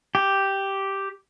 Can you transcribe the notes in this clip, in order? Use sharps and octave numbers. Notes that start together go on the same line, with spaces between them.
G4